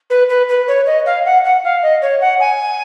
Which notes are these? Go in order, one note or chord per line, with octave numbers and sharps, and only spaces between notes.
B4
B4
B4
C#5
D#5
F5
F#5
F#5
F5
D#5
C#5
F#5
G#5